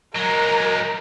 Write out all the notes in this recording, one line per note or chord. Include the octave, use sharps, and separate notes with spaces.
F#3 G#3 A#4